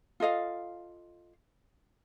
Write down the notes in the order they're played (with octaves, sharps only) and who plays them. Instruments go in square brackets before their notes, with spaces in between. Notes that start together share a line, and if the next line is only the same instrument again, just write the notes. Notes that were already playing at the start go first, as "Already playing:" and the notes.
[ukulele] F4 A4 D#5 F5